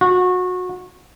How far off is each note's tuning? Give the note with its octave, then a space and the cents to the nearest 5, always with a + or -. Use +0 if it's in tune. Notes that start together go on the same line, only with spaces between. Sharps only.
F#4 -25